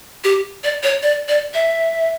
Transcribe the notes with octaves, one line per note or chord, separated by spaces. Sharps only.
G4
D5
C#5
D5
D5
E5